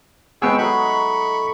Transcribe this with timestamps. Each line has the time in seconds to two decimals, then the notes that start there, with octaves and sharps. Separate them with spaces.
0.42 G#3 B3 G#4 G5 C#6 E6
0.58 F#3 A3 D#4 B5 C#6